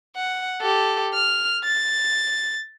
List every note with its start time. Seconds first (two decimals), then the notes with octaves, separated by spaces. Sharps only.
0.16 F#5
0.61 G4 A4
1.14 F6
1.64 A6